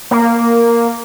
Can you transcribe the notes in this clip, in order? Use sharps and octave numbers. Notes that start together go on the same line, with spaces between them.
A#3